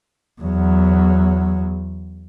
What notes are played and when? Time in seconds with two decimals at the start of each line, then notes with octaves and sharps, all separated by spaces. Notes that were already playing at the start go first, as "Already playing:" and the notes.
0.42 E2 F#3